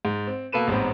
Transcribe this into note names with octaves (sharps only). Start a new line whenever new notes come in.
G#2
C4
B2 A#3 A4 B4 D#7 E7
A1 G#2 B3 C4 A#5